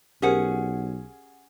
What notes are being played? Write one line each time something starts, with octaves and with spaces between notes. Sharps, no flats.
B1 C#4 G4 G#4 A#4 C5 F#5